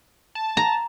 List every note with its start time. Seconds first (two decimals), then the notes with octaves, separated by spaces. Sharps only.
0.35 A5
0.57 A#5